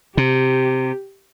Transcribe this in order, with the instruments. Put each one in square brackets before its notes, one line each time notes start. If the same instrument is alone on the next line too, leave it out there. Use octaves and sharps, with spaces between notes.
[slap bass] C3 [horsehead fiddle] G4